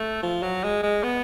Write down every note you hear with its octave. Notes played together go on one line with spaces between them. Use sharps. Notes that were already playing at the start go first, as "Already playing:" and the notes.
Already playing: A3
F3
F#3
G#3
G#3
B3